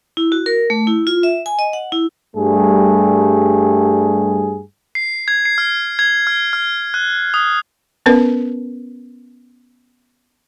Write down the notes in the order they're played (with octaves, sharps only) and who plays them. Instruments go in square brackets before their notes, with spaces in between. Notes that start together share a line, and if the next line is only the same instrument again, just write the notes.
[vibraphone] E4
F#4
A#4
A3
E4
F4
E5
G#5
D#5
F#5
E4
[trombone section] G2 G3 A3 G#4
[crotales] C7
G#6
C7
F6
G#6
F6
F6
F#6
D#6
[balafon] B3 C#4 A#4 B4